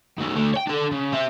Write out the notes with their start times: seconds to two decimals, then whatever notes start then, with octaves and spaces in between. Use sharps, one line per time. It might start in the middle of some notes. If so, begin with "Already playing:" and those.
0.18 D#3 A3
0.36 D3 A3
0.54 C#5 G5
0.67 D4 A4
0.91 C#3
1.12 C4 E5